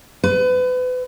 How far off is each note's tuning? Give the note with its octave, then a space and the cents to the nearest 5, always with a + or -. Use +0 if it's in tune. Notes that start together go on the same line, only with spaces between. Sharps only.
B4 +35